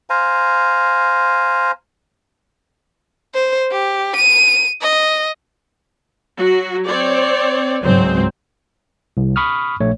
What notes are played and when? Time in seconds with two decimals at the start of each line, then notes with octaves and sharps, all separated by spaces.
0.10 C5 F5 G#5 A#5
3.34 C5
3.71 G4
4.16 D#7
4.82 D#5
6.36 F#3 F#4
6.86 C4 C#5 D5
7.82 C#2 G#2 F#3 C4 C5
9.17 C2
9.36 B5 C#6 D#6 F6
9.80 A#1 A3 C#5